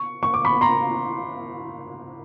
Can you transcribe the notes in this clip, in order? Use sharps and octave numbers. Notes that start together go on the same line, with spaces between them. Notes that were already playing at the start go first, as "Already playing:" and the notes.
Already playing: C#6
C#6
D6
B5 C#6
A#5 C6